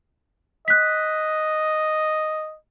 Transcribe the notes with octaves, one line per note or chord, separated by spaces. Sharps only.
D#5 F#6 B6